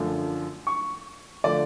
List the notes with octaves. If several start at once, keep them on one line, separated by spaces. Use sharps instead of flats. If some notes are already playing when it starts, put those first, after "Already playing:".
Already playing: F#2 D3 F3 A3 D4
C#6
D3 F3 A3 D5